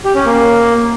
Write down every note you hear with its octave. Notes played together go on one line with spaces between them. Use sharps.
G4
C#4
A#3